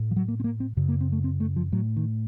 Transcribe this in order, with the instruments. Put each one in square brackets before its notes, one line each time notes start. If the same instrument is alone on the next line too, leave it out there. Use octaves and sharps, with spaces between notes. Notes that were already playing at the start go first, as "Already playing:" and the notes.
Already playing: [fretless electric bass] A2
F3
F#3
A#3
C4
A#3
C4
F#2 C#3
A#3
C4
A3
C4
A3
F3
A2 F#3
D#3